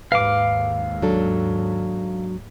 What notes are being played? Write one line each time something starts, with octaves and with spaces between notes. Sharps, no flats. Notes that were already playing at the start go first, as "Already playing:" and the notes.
D#2 G#2 B4 F5 D6
F#3 D4 A4